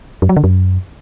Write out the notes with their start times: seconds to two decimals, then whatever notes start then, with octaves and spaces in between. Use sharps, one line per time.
0.22 F#2
0.29 F#3
0.37 D3
0.44 F#2